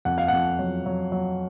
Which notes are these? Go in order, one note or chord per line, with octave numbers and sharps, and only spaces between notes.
F2 F#5
F5
F2 F#5
F#3
F#3
F#3